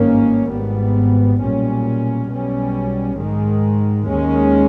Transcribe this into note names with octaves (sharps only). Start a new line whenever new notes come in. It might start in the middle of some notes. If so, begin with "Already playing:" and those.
Already playing: G#1 G2 D#3 A#3 C#4
G#1 G#2 G3 B3
B1 A#2 G3 C#4
B1 B2 G3 C#4
G#2 D#3 G#3
D#2 D#3 G#3 C#4